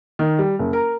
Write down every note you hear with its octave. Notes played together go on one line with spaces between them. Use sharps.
D#3
G3
F#1
A#4